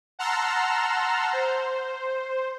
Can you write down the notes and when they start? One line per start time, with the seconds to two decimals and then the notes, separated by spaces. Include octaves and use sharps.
0.19 F#5 A5 A#5 C6 E6 F6
1.33 C5